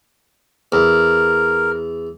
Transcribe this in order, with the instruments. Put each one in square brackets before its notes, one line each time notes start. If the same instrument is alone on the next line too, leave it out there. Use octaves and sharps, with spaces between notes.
[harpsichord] E2 [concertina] A#4